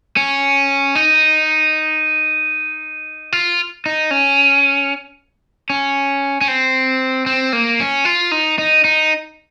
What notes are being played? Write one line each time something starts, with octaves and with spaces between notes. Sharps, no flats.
C#4
D#4
F4
D#4
C#4
C#4
C#4
C4
C4
A#3
C#4
F4
D#4
D#4
D#4